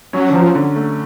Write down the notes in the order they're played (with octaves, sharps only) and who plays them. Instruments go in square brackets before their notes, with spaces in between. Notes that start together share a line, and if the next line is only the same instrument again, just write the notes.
[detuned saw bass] F#3 [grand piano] C#4
[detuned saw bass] D3
[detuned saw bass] F3 [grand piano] F#3
[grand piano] D3
A3